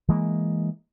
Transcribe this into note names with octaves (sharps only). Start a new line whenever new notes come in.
E3 G#3 A#3